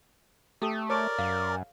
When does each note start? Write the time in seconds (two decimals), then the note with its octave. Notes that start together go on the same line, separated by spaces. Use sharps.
0.62 A3 G4 A4 D#6
0.90 A#4 C#5 D5 D6
1.19 F#2 F5